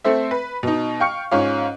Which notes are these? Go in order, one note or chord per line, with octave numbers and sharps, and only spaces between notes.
A3 C4 A4 C5 E5
B4
B2 D#4
F5 G5 C#6 F6 C#7
G#2 C#4 F4 C#5 F5